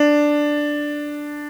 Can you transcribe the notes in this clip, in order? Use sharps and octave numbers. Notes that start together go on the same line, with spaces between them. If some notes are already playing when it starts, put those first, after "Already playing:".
Already playing: D4